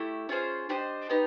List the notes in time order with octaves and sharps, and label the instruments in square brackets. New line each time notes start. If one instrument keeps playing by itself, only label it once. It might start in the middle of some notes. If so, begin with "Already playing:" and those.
Already playing: [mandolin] A3 E4 G4
C#4 F4 G#4 C5
D4 G4 C5 D#5
B3 D#4 G4